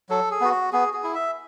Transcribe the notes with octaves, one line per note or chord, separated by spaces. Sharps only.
F#3 A4
G#4
B3 F#4
F#4
B3 G#4
G#4
E4
E5